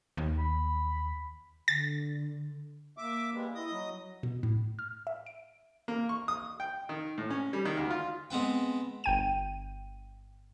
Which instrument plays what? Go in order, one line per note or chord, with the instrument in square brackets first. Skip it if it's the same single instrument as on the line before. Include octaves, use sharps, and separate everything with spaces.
[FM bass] D#2
[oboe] B5
[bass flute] D3 [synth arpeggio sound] A6
[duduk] A#3 [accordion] E5 D6
[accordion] G3 G#3 B3
[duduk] E4 [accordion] D#5 D#6
[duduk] F#3
[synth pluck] B2
A2
F6
E5
D7
[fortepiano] A#3
C#6
D#6
G5
D#3
A2
C#4
G3
D#3
D2
F4
[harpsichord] G#3 B3 C4 B4 G5
[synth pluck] G1 G5 D#7